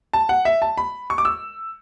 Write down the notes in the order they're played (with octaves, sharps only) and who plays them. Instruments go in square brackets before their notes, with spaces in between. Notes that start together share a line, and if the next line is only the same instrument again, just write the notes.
[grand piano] A5
F#5
E5
A5
B5
C#6
D6
E6